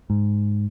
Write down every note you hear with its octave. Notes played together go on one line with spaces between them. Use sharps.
G#2